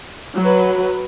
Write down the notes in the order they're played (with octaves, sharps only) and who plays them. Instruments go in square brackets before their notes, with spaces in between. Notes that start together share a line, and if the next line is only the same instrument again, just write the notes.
[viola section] F#3 B4